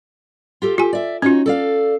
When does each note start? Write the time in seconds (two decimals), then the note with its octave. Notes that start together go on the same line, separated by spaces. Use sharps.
0.62 F4 G4 A4
0.78 F4 G4 G#5
0.93 D5 E5
1.22 C#4 D#4 F4 F#4 C#5
1.46 A4 D5 F5